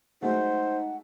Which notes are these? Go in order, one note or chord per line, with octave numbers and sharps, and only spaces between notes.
F#3 G#3 A3 D#4 C5 F#5